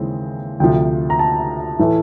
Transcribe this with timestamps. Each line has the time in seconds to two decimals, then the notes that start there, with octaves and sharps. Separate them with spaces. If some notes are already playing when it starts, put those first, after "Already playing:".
Already playing: D#2 C#3 E3 G#3 C4
0.60 D2 C3 F3 G5
1.10 A#5
1.19 A5
1.79 A2 E3 A3